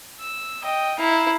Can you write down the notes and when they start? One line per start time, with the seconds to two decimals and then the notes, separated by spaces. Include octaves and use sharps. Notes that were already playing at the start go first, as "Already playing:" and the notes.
0.21 E6
0.63 D#5 G5
0.99 E4 F5 A#5